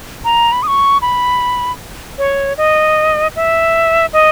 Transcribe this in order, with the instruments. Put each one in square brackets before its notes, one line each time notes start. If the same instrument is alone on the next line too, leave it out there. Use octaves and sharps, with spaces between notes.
[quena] A#5
B5
D#6
C#6
B5
C#5
D#5
E5
D#5